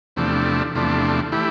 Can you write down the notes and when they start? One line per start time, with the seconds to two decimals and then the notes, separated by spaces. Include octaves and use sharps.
0.16 E2 C3 F3 A3 D4
0.75 E2 C3 F3 A3 D4
1.32 E3 A3 E4 G4